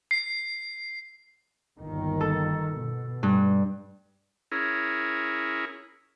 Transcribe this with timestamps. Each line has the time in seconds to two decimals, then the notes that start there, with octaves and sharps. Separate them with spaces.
0.11 C7
1.79 G1 D#2 D#3
2.20 A4
2.76 B2
3.23 G2
4.52 C#4 E4 G#4 A#4